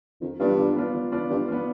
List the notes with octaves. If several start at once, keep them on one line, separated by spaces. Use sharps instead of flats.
F2 D#3
G2 B3 D4 F4
D#3
B3 D4 F4
D#3
B3 D4 F4
G2 D#3
B3 D4 F4